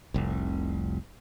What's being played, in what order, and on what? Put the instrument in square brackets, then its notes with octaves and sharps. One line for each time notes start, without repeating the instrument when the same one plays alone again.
[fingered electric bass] F1 C2